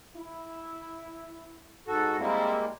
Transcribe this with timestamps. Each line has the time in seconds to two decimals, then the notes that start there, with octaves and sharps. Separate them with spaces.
0.16 E4
1.88 G#2 F#4 A4
2.19 G3 G#3 A#3 C4 E4